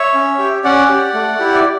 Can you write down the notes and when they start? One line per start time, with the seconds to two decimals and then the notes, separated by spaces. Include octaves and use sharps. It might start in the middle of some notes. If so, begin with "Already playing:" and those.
Already playing: C#5 E5
0.14 C#4
0.39 G4
0.64 C#4 D5 F#5
0.89 G4
1.14 A3
1.39 E4 G4
1.54 D5